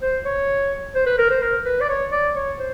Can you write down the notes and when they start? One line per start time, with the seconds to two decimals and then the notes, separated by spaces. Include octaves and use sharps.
0.02 C5
0.25 C#5
0.95 C5
1.06 B4
1.18 A#4
1.30 C5
1.42 A#4
1.65 B4
1.81 D5
1.89 C#5
2.12 D5
2.35 C#5
2.59 C5